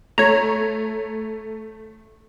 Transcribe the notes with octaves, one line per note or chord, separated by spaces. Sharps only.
A3 C#5 A#5